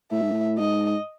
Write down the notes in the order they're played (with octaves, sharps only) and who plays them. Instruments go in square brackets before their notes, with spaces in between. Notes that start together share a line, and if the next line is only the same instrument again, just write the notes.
[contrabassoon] A2 [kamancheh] E5
[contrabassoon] G#2
A2
[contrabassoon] G#2 [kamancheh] D#5